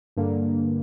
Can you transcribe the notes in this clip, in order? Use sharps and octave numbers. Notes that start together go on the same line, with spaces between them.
G2 D3 A#3